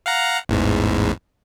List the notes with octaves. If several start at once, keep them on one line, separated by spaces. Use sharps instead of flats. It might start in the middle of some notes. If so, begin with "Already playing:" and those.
F5 F#5 A#5
A1 E2 G#2